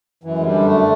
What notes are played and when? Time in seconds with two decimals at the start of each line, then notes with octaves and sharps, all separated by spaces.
0.23 F#2 E3
0.39 G#3
0.44 D3 G3
0.65 F#2 A3